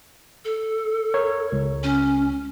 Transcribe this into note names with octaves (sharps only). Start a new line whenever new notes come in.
A4
A#4 C#5
C#2
C#4